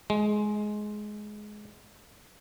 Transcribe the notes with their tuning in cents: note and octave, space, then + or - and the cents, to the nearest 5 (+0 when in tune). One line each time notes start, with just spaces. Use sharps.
G#3 +15